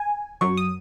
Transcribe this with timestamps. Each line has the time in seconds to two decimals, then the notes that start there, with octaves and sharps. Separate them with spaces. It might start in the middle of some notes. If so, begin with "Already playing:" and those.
Already playing: G#5
0.41 F#2 F#3 C#6
0.57 D#6